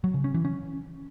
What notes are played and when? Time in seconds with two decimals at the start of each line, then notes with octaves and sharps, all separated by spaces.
0.04 F#3
0.14 C#3
0.24 C#4
0.34 E3
0.45 C#4